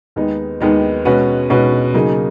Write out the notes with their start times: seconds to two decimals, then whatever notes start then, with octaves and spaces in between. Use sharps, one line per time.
0.16 D#2 D#3 G#3 B3 D#4
0.61 D#2 D#3 G#3 B3 D#4
1.05 B2 G#3 C#4 F#4 B4
1.50 B2 G#3 C#4 F#4 B4
1.94 C#3 F#3 A#3 D#4 G#4